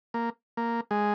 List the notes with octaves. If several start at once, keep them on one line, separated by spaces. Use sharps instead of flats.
A#3
A#3
G#3